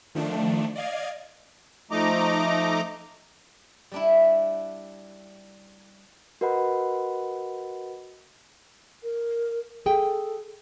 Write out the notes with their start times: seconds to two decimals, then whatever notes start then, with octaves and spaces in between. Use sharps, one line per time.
0.15 D#3 F3 A3 D4
0.76 D5 D#5 F5 G#6
1.91 F3 A3 D#4 D#5 A#5 D6
3.92 G3 D4 E4
6.41 F#4 A#4 B4 D#5 F#5 B5
9.03 A#4
9.86 G#4 A4 G5